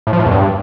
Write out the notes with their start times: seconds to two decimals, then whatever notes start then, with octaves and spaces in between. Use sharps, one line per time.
0.07 A2
0.13 F3
0.19 A2
0.25 E2
0.31 G2